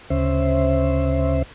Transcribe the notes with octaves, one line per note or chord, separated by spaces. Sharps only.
D2 C#3 C#4 C5 E5